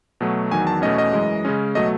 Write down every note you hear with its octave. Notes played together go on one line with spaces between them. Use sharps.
B2 F#3 A3
E2 D#3 F#3 G#5
A5
E2 B2 A3 C#4 D#5
D#5
F#2 E3 G#3
C#3 G#3 C#4
B2 F#3 A3 D#5